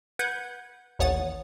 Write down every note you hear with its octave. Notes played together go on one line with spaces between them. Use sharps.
B4 F#5 G6 G#6
A1 D#2 C#5 F#5 D#6 A6